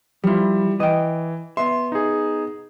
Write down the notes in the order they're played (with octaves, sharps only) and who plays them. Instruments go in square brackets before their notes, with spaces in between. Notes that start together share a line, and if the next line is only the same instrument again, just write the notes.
[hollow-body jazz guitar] F3 F4 [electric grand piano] G3 E4
[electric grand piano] E3 [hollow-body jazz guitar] D#5 G5
[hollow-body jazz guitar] B3 E5 [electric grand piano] C6
[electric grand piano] D#4 G#4